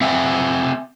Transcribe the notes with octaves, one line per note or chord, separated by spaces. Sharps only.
C4 E5 F#5 G#5